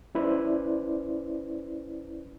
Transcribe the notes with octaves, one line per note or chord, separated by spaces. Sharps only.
C#4 E4 B4 C5 D5